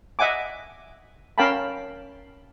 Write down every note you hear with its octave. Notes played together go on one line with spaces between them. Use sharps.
D#5 E5 F#5 G#5 D6
C#4 A#4 F5 G5 A5 B5